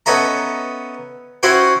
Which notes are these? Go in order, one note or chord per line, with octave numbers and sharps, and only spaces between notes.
B3 C#4 A4 D#5 E5 A#5
C#4 E4 F#4 C5 C#5 G5